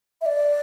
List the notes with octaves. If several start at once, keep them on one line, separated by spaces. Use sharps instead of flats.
E5
D5